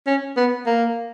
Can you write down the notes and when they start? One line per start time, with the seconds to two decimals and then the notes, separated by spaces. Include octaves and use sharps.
0.07 C#4
0.37 B3
0.67 A#3